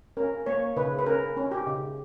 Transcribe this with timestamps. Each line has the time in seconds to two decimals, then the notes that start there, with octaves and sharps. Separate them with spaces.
0.17 C#4 A#4
0.46 A#3 C#5
0.77 C#3 B4
0.99 B4
1.06 C#4 A#4
1.37 C#4
1.51 G4
1.67 C#3